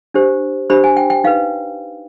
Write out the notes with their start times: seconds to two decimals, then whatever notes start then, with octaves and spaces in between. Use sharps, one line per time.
0.14 D4 G4 C5
0.70 D4 G4 C5 B5
0.84 G#5
0.97 G5
1.10 G5
1.24 D#4 B4 F5